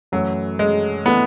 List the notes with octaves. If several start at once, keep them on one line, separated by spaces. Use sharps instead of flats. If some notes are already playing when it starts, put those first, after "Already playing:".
F#2 E3 F#3 A3 E4 A4
G#3
E3 A3 B3 E4 A4